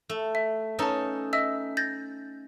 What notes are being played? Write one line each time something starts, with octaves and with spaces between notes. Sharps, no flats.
A3
E5
C#4 D#4 A4 B4 A5
D#5 E5 E6
G6 A6 A#6